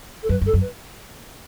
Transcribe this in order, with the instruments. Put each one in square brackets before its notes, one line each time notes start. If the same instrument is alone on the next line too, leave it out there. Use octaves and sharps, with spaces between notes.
[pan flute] A4
[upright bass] F#2 [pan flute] B4
[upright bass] G2
[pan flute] A4
[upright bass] F#2
[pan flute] B4